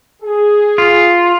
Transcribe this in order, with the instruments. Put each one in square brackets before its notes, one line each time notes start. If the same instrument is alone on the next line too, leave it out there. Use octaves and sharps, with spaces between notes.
[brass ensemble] G#4
[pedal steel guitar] F4